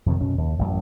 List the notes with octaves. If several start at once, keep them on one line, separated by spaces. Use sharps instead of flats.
F2 C3 D#3
F#2 B2 C#4
D#2
A1 F#2